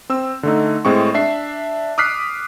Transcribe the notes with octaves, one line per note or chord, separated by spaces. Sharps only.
C4 E6
D3 A3 D#4
A2 G#3 C4 C#6
D4 E5 C7
D6 D#6 F6 F#6 B6 C7